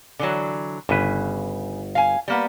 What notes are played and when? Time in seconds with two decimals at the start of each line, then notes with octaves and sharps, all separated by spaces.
0.19 D3 E3 F#3
0.89 G1 C#3 B4
1.95 F5 G#5
2.28 G3 A#3 B3